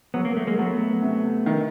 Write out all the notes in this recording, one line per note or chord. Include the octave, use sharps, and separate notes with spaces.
F#3 B3
A#3
A3
G#3 A#3
F#3 A3 B3
C3
D#3